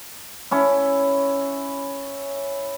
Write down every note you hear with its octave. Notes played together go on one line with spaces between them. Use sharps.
C#4 E4